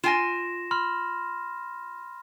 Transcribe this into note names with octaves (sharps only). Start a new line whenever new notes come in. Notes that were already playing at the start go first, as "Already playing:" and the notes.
F4 G5 G#5 A#6 E7
B5 C6 F6